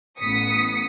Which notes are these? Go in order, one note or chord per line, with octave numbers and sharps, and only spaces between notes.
A1 B3 D#6 B6 C#7